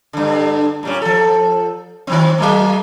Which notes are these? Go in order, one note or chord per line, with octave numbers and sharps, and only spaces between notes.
G2 D3
A#2 G3 C#4
F3 A4
D#3 F#3 C4
F#3 G#3 A#3